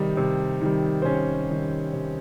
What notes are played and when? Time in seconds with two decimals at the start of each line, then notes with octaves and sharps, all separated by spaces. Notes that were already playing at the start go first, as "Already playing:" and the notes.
Already playing: C3 D#3 G3 D#4
0.17 C3
0.61 D#3 G3
1.02 C5
1.05 C3 C#4 C#5
1.50 D#3 G3
1.93 C3